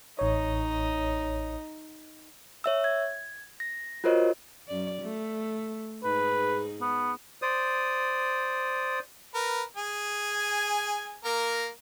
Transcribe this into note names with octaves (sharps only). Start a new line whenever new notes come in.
A1 D#4 C#5 D#5
C#5 E5 E6
G#6
A#6
F4 F#4 A#4 C5 C#5 D#5
F#2 D5
A3
G#2 D#4 G#4 B4
B3
C5 D5 D#6
A#4 B4
G#4 G#5
A#3 A#4